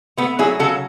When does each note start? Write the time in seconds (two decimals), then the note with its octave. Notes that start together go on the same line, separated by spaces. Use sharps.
0.17 A3 B3
0.39 F#3 E4 G#4
0.59 C#3 F#4 A4